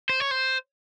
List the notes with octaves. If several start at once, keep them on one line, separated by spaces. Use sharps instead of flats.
C5
C#5
C5